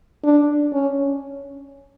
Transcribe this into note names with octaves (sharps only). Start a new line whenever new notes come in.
D4
C#4